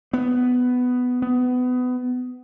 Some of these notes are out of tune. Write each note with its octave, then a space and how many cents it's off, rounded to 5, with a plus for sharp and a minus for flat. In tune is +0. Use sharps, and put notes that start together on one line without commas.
B3 +10
B3 +25